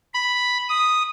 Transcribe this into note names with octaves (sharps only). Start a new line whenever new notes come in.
B5
D#6